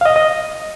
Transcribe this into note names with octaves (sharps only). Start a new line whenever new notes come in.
F5
D#5
D#5